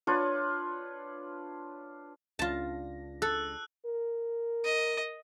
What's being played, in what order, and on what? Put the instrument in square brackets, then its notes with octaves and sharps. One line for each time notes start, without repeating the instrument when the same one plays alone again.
[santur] D4 F4 B4 C#5
[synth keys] C#2 D4 A#6 [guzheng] F4 A5
[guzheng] A4 [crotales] E6 F#6
[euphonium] A#4
[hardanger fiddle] D#5